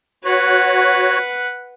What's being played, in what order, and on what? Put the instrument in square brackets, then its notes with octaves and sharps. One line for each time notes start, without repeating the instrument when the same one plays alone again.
[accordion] F#4 C#5 [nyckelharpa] B4 F#5